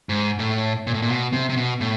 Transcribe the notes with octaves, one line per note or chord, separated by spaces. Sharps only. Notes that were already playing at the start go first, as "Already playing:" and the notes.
G#2
A2
A#2
A2
A#2
B2
C3
C3
B2
A2